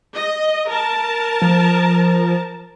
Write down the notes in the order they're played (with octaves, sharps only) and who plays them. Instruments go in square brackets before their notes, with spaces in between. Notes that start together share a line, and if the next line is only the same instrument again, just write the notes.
[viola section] D#5
A#4 A5
[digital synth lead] F3